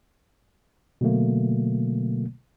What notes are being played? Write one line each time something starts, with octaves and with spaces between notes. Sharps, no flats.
B2 D3 F#3 A3 A#3